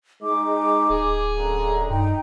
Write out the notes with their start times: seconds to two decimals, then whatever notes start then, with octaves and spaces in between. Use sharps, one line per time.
0.23 G#3 D#4 D6
0.90 D1 G#4
1.37 F#2 D3 A#5
1.90 G2 D#4 G5